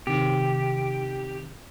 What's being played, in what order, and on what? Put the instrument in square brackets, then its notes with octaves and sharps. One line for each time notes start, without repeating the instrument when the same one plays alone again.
[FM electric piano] C3 D#3 [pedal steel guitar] G4